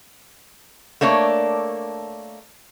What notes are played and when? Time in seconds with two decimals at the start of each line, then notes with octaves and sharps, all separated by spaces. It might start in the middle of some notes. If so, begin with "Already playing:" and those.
1.01 A3 A#3 D4 C#5